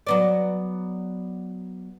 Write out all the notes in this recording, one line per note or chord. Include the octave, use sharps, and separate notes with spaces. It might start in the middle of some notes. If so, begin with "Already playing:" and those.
F#3 B3 D5